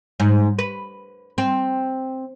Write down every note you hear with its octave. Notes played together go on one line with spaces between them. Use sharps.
G#2
B4
C4